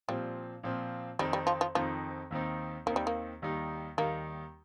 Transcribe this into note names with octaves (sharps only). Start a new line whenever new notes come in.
A#2 F3 G3 C4
A#2 F3 C4
F2 D#3 G3 C4 D#4
G3
F3
F3
F2 D#3 F3 C4 D#4
D#2 D#3 C4 D#4
D#2 D#3 A#3 C4 D#4
G3
A#3
D#2 D#3 G3 D#4
D#2 D#3 G3 A#3 D#4